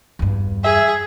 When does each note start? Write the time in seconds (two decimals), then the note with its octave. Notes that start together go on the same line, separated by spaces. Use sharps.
0.19 E2 G2
0.64 G#4 E5